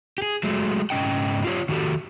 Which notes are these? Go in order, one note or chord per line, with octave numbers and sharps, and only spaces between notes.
G4 G#4
F#3 G#3 A3
G#2 C#3 C#4 D#5 G5
F4 G4 A4 C#5
D#3 F#4 G4 A4